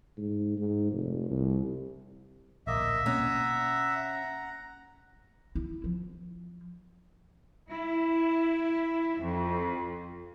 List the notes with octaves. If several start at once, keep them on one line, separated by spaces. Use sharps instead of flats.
G#2
G#2
F1
C2
D1 A#1 A#3 D#5 E5
B2 A#3 C4 C#4 F#5 A#5
E4
F3
E4
F2